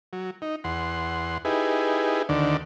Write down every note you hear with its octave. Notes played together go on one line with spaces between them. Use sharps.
F#3
D#4
E2 F#5 C6
D#4 E4 G4 G#4 B4
D2 D3 D#3 D5